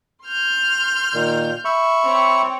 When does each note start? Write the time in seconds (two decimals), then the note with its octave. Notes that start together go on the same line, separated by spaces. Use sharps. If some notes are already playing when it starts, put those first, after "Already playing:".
0.26 C6 F6 G6
1.14 A#2 D#3
1.65 E5 B5 C#6
2.04 C4 C#5